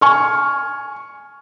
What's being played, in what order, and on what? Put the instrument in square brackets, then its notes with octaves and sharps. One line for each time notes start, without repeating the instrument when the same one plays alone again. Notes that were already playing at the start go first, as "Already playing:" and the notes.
[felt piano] G#5 C#6 F6